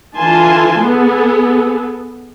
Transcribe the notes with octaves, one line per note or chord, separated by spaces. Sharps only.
D3 E3 F4 G#5 A5 C6
B3 G#4 A4